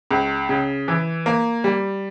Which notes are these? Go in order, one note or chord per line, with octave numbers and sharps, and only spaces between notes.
C#2
C#3
E3
A#3
G3